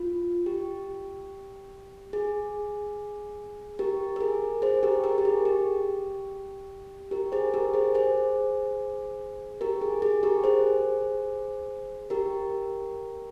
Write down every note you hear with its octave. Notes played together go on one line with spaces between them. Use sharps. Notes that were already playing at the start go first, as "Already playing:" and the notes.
Already playing: F4
G4
G#4
G4 A#4
A#4
G#4
G#4 C5
G4 A#4
G4 A#4
G4
G#4
G4
G4 A#4
G#4 C5
G4 A#4
G#4 C5
G#4 C5
G4 A#4
G#4
G#4
G4 A#4
G#4 C5
G4 A#4